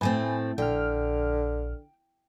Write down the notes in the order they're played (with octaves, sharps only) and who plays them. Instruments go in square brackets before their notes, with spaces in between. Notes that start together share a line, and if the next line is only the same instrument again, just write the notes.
[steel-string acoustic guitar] A2 A3 C4 [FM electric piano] B4 G#5
[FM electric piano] A#1 F6 [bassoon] D3 [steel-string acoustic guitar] G5